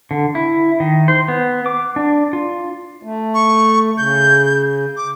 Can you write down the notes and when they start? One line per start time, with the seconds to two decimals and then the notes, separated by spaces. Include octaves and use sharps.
0.11 D3
0.35 E4
0.80 D#3
1.08 C5
1.28 B3
1.66 D6
1.96 D4
2.33 F4
3.03 A3
3.34 C#6
3.98 C#3 G6
4.97 D6